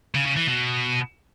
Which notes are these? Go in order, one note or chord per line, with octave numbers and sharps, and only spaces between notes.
C#3
C#3
E3
B2